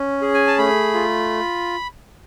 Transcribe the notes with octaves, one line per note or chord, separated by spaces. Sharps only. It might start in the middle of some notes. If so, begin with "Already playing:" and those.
Already playing: C#4
G#4
G#5
A5
A3 B5
F4